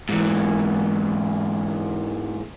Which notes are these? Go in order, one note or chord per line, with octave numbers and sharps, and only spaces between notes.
G#2 E3